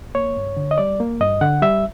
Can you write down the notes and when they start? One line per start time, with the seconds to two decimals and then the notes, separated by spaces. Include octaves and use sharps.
0.15 A#3 C#5
0.37 G2
0.57 D3
0.71 D#5
0.78 G3 D5
1.00 A#3
1.21 G2 D#5
1.41 D3 F#5
1.62 G3 E5